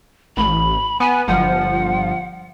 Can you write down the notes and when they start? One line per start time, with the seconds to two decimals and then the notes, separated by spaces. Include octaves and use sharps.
0.37 A1 B5
1.00 B3 G#5
1.28 G1 F3 F#5